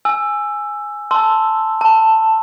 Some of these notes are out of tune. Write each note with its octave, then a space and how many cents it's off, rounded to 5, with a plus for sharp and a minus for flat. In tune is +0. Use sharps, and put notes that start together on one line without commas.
G#5 +0 E6 +10
A5 +0 C6 +0 E6 +0
A5 +10 D6 -15